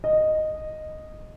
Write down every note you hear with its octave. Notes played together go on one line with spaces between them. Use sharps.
D#5